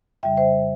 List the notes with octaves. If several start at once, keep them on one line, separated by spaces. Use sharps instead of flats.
F2 C#3 G3 E5 G5
C5 E5